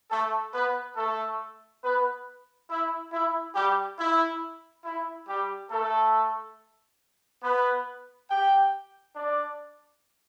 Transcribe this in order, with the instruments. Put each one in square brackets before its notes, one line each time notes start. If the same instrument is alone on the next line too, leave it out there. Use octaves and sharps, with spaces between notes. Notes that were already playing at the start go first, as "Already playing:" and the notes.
[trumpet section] A3 A4
B3 B4
A3 A4
B3 B4
E4
E4
G3 G4
E4
E4
G3 G4
A3 A4
B3 B4
G4 G5
D4 D5